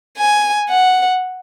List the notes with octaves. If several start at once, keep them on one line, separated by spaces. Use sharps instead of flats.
G#5
F#5